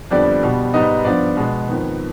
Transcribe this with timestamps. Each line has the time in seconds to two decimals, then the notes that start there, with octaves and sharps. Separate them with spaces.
0.10 F2 D3 G3 B3 D4 D5
0.43 B2 G3 B3
0.74 G#2 G3 B3 D#4 D#5
1.05 G2 F3 B3 D4 D5
1.37 B2 G#3 B3
1.68 F2 D#3 B3